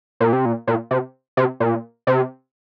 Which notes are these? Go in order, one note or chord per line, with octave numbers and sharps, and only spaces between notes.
A#2
C3
A#2
A#2
C3
C3
A#2
C3